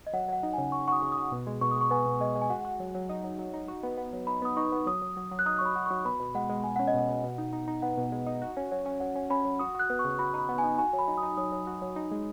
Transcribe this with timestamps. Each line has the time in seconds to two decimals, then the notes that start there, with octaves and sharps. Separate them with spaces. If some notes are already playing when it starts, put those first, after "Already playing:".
0.07 D#5
0.13 F#3 F#5
0.28 F#3 F#5
0.43 D#4
0.53 C#3 G#5
0.72 C#3 C#6
0.87 F#4 C#6
0.92 D#6
1.02 C#3
1.12 D#6
1.17 F#4
1.32 B2
1.47 G#3
1.61 B2 C#6
1.71 D#6
1.76 G#3 C#6
1.91 B3 G#5
2.06 B2
2.21 G#3 D#5
2.36 G#3
2.41 G#5
2.50 F#4 F#5
2.65 F#4
2.80 F#3
2.95 F#3
3.09 D#4
3.24 F#3
3.39 F#3
3.54 D#4
3.68 F#4
3.83 B3
3.98 B3
4.13 F#3
4.27 D#4 B5
4.42 B3 D#6
4.57 D#4 C#6
4.72 B3
4.86 F#3 D#6
5.02 F#3
5.17 F#3
5.31 F#3
5.39 F#6
5.46 D#4 D#6
5.58 C#6
5.61 F#3 B5
5.76 F#4
5.86 F#3 C#6
6.05 B2 B5
6.20 B2
6.35 G#3 F#5
6.49 G#3
6.64 G#3 G#5
6.76 C#4 F#5
6.87 D#5
6.94 B2 F#5
7.09 B2
7.23 B2
7.38 D#4
7.53 D#4
7.68 D#4
7.82 B3 F#5
7.97 B2
8.12 G#3
8.27 D#4
8.42 F#4
8.57 C#4
8.72 F#3
8.86 C#4
9.00 F#3 F#5
9.16 C#4
9.30 C#4 B5
9.45 F#3
9.59 F#4 D#6
9.75 F#4 F#6
9.90 B3
9.99 C#6
10.05 C#3
10.19 F#4 B5
10.34 D#4 B5
10.49 B3
10.58 G#5
10.63 D#4
10.78 F#4 G#5
10.93 F#3
10.99 B5
11.08 D#4
11.18 D#6
11.23 D#4
11.37 F#3 D#6
11.52 F#3
11.67 F#4
11.82 F#3
11.96 D#4
12.11 G#3